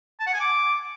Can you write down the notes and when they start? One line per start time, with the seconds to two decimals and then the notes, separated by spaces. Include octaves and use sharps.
0.20 A5
0.27 F#5
0.33 G#5
0.40 D6